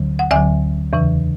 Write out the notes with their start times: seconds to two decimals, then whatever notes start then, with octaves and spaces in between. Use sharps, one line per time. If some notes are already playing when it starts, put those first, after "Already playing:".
Already playing: D2 D3 F#3
0.19 F#5
0.31 D2 D3 F#3 E5 G#5
0.93 E2 C#3 E3